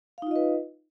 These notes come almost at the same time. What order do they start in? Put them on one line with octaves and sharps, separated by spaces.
F5 D#4 F4 D#5 B4